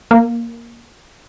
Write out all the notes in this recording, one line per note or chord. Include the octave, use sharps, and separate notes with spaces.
A#3